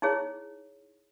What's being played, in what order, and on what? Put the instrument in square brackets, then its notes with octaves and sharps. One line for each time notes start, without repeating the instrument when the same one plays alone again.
[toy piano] D#4 E4 G#4 C#5